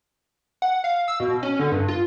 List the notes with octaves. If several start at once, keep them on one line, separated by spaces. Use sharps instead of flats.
F#5
F5
E6
B2
C#4
D3
G2
F4